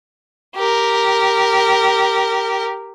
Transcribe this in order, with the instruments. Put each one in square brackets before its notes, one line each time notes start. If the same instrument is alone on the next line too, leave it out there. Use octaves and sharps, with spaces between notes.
[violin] G4 A#4